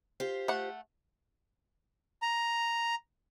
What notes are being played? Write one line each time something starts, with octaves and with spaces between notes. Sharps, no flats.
F4 G4 C5
A3 F#5
A#5